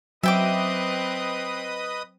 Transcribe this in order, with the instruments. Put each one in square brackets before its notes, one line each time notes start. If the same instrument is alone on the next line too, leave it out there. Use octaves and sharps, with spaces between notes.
[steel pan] F#3 [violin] C4 [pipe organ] B4 D#5 D#6 [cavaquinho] E5 G5 D6